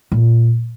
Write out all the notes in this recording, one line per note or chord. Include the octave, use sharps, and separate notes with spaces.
A#2